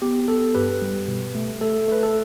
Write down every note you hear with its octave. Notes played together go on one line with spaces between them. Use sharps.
B3 G4
B3 A4
G2 G4 B4
G3
B2
A3
A3 A4
A3 B4
A4